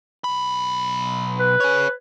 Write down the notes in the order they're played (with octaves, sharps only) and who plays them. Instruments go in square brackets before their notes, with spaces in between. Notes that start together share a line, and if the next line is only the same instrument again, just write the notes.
[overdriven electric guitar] B1 B5
[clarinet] B4
[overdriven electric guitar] G#4 C#5